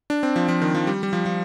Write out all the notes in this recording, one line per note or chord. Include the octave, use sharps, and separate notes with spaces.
D4
C4
F3
F3
D#3
F3
G3
G3
F3
F3